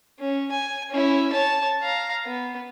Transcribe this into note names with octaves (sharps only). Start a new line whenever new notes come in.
C#4
G#5
C#4 E4
C#5 A5
F5 A#5
B3